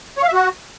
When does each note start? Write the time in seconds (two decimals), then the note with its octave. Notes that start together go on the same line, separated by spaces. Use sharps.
0.18 C#5
0.23 F5
0.28 E5
0.33 F#4